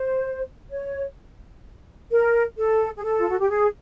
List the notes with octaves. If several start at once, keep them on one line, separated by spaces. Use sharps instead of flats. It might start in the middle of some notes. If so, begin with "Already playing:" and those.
Already playing: C5
C#5
A#4
A4
G#4
A4
F4
F#4
G4
G#4